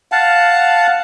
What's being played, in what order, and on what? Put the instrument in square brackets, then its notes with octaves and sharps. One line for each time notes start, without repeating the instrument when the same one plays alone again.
[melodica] F5 F#5 A5